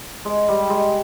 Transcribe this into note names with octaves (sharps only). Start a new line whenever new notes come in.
G#3
G3
G#3